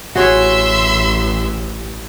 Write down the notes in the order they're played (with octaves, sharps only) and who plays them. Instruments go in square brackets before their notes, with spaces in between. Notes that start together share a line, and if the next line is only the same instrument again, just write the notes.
[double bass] A1 [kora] F#4 G#4 C#5 [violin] E5 C6